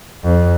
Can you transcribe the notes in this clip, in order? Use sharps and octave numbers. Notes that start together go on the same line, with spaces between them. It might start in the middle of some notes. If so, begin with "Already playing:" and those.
F2